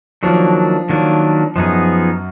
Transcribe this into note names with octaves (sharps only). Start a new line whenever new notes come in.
D#3 F3 F#3 A#3 D4
D#3 F#3 A#3 D4
F#2 F3 B3 D#4 G#4